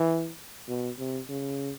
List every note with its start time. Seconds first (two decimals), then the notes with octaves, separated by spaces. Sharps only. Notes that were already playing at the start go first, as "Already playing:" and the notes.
Already playing: E3
0.68 B2
0.99 C3
1.29 C#3